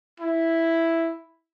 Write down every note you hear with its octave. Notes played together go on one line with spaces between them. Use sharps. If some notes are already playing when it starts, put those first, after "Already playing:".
E4